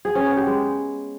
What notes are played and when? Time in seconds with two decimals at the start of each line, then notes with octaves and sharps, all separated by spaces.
0.05 G#4
0.15 C#4
0.26 B3
0.36 G4
0.47 G#3